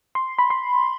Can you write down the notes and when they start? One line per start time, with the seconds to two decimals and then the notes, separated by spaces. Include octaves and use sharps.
0.15 C6
0.39 B5
0.50 C6